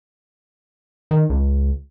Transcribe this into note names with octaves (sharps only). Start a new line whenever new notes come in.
D#3
C#2